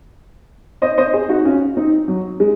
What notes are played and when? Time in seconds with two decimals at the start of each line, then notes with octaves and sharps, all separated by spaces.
0.82 C5 D#5
0.98 C5 D#5
1.13 G#4 C5
1.29 D#4 F#4
1.45 C#4 F4
1.77 C4 D#4
2.08 F#3
2.40 G#3